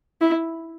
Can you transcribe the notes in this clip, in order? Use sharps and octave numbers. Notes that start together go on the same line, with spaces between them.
E4